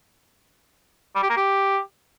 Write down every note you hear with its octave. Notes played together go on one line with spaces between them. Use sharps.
G3
G4
A#3
G4